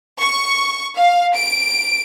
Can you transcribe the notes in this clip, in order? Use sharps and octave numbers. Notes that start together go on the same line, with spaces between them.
C#6
F5
D7